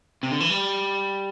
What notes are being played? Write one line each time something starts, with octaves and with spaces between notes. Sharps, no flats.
C3
D3
E3
G3